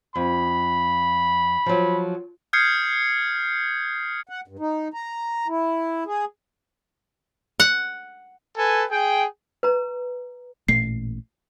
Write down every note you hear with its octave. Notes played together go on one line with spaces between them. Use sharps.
F2 B5
F3 F#3
D#6 F6 G6 G#6 C7 C#7
F#5
G2
D#4
A#5
E4
G#4
F#5
A4 B4 G#5
G#4 G5
B4 A#5
A1 A#2 A3 C7